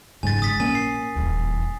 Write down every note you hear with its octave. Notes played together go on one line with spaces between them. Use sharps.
F#1 G#2 G#5 A6
A#1 D#6 A6 B6
A#3 C#4 G#5
C7
D#1 E2